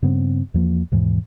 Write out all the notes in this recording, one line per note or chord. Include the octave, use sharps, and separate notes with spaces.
G2 C#3 B3 C4
E2 F3 A#3
D#2 G#2 B2 E3